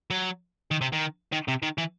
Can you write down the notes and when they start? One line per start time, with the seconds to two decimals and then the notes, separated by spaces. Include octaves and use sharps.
0.10 F#3
0.71 D#3
0.81 C3
0.92 D#3
1.32 D#3
1.48 C3
1.63 D#3
1.78 E3